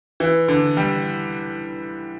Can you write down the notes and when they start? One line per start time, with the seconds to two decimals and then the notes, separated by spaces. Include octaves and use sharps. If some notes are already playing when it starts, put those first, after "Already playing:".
0.20 E3
0.48 D3
0.77 G3